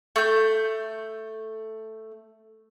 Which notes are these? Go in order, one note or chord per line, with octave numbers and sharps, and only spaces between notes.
A3 G6